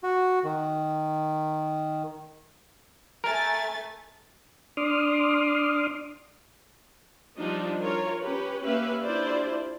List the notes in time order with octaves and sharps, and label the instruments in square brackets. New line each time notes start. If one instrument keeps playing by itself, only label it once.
[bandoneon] F#4
D#3
[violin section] A3 G#5 A6 [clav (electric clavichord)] A#4
[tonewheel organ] D4 C6 D6 D#6 F6
[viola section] F3 G3 D4 D#4 F4
F4 A#4 C#5
C#4 G4 B4
A#3 C#4 G4 B4 E5 F5
D4 E4 F4 G4 C5 D5